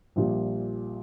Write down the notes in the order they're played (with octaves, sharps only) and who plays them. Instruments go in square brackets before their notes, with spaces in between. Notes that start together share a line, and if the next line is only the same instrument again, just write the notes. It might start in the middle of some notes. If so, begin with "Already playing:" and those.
[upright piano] A#1 A#2 G3